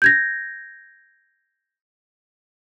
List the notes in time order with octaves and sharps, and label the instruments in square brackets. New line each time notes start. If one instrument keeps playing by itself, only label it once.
[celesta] G6 G#6 A#6